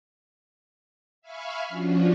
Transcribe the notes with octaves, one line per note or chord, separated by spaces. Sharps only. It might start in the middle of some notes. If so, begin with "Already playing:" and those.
E5 F5 G#5 B5 C#6 F6
F3 C#4 D4 F4 F#4